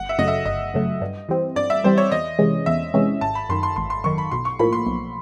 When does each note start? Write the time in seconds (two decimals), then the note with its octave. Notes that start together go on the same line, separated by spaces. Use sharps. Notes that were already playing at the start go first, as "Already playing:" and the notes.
Already playing: G1 F#5
0.09 E5
0.18 F#2 C#3 F#3 A3 D#5
0.28 E5
0.46 G1 D#5
0.74 F#2 C#3 F#3 A3
1.01 G2
1.29 E3 G3 C4
1.56 G2 D5
1.70 E5
1.84 E3 G3 C4 C5
1.98 C#5
2.12 E2 D#5
2.39 C3 E3 G#3 C#4
2.66 E2 E5
2.94 C3 E3 G#3 C#4
3.21 G#1 A5
3.35 B5
3.49 F#2 D#3 C6
3.63 C6
3.76 G#1 C6
3.90 C6
4.04 F#2 D#3 C#6
4.18 B5
4.31 B1 C6
4.45 C#6
4.59 A2 F3 A#3 B5
4.73 C6
4.86 B1